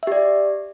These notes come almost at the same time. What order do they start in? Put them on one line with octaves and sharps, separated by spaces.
E5 G4 D5